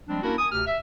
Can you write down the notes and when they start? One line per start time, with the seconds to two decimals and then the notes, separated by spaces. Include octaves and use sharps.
0.08 F3 G3 G#3 C4 D4
0.22 A#3 C#4 D4 E4 F#4 A#4
0.38 G#5 D#6
0.52 D2 C3 G4 F6
0.66 E5